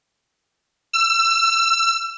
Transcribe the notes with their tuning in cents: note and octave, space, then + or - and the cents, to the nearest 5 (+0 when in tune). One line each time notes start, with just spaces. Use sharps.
E6 +30